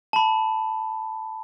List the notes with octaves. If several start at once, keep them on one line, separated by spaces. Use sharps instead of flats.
A5 B5